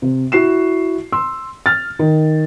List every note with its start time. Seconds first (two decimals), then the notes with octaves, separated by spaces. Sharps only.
0.02 C3
0.32 E4 F#4 C7 E7
1.12 C6 E6
1.66 F6 A6
1.99 D#3